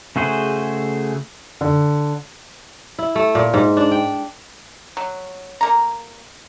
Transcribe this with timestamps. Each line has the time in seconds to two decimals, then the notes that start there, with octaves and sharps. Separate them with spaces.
0.16 C#3 A3 F#4 G#4 C5
1.61 D3
2.99 E4
3.15 A3
3.35 A#2
3.54 G#2
3.77 D4
3.91 G5
4.97 F#3
5.61 A#3 A#5